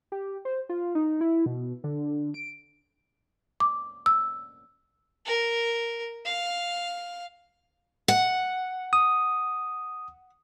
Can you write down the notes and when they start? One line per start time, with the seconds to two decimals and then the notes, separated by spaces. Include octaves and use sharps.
0.12 G4
0.45 C5
0.69 F4
0.95 D#4
1.21 E4
1.46 B2
1.84 D3
2.34 D7
3.60 D6
4.06 E6
5.26 A#4
6.26 F5
8.08 F#5
8.93 D#6